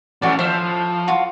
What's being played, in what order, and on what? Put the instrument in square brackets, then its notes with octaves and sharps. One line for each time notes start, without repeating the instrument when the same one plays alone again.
[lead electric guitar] A2 C#4 [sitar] E3 F3 A3 [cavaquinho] F#4 D5
[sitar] D#2 C5 E5 [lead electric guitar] F3 [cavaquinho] F5
[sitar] A2
[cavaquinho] F4 F#4